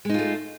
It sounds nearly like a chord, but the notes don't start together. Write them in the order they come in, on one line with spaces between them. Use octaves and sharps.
G#3 D#4 F4 A3